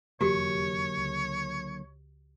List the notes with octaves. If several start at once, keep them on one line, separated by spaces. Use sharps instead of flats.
F1 E2 D3 F#3 A#3 F#4 G4 C#5
C#2